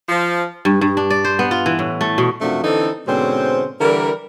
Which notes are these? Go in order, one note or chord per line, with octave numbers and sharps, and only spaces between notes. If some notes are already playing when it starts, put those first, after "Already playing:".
F3
G2
G2
D4
D5
C5
B3
F4
E3
A2
A3
B2
F#2 C3 F3 A3 D4 F#4
D3 E3 C4 D#4 A4
G#2 B2 D3 C4 C#4 C5
D3 E3 G3 E4 A#4